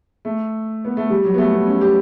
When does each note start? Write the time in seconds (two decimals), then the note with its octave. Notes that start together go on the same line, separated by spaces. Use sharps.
0.25 A3
0.85 B3
0.97 A3
1.10 G3
1.24 F#3
1.34 B3
1.38 A3
1.53 B3
1.67 C#4
1.81 G4